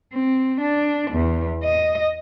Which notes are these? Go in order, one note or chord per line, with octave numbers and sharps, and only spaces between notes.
C4
D4
E2
D#5